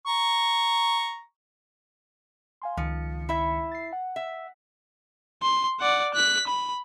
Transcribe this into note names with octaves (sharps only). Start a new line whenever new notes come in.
A#5 C#6
F5 G#5 C6
C#2 D#3 F3 C#7
E4 E5
A6 C7
F#5
E5
C6
D5 F#5
F#6 B6
B5